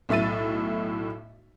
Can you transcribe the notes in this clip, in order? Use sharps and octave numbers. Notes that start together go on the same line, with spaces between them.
B1 A2 E5 A6 D#7